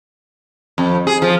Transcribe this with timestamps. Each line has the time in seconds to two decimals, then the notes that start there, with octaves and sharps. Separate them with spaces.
0.78 F2
1.07 G#4
1.22 F3